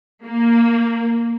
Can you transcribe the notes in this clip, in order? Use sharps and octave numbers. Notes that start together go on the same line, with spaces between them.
A#3